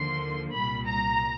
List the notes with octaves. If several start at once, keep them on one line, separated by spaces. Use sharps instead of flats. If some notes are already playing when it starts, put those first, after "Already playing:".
Already playing: D#2 D3 F3 A#3 C6
C2 A#2 G3 B5
A#5